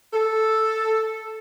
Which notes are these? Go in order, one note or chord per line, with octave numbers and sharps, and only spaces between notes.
A4